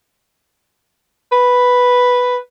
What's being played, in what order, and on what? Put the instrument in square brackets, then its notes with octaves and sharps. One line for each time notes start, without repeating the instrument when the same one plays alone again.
[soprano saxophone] B4